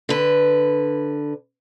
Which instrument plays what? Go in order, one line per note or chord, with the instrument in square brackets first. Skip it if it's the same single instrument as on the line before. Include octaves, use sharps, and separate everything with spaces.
[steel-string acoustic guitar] D3 B4